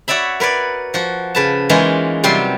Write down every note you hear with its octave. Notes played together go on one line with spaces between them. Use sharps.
F#4 C#5 D5 E5 B5
A#4 B4 C#5 D5
F3 F#4
C#3 B4 A5
E3 G#3 A#3 C#4 D#4 F4
C3 F#3 G3 F4 C5 C6